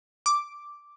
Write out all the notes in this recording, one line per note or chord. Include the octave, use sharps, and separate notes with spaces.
D6